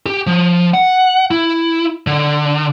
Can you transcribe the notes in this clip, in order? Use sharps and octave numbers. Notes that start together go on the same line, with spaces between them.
G4
F3
F#5
E4
D3